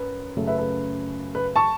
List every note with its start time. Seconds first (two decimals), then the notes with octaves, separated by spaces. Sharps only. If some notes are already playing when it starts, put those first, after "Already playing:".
Already playing: F#2 B4
0.37 F#2 C#3 F#3 A3
0.47 B4 E5
0.58 B4
1.35 B4
1.56 A5 C#6